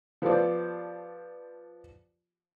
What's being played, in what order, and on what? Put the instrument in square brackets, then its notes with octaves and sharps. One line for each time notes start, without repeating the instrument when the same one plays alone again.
[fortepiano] F3 B3 G4 A4 C5 D5